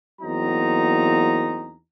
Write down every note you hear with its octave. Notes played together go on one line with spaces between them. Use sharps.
E2 F#3 A#3 C4 D#4 A#5